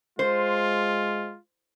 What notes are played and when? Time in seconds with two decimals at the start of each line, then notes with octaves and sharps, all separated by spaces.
0.19 G#3 F4 C5